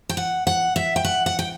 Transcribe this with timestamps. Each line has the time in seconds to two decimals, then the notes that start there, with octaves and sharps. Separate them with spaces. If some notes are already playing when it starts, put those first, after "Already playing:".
0.09 G5
0.17 F#5
0.47 F#5
0.76 E5
0.96 G5
1.05 F#5
1.26 F#5
1.39 G5